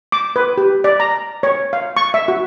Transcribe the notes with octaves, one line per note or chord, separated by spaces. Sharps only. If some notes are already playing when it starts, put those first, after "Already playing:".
D6
B4
G4
D5
A#5
C#5
F5
C#6
E5
F#4